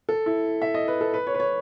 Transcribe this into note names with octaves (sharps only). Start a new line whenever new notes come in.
A4
E4
E5
D#5
B4
A4
B4
C#5
B4
C#5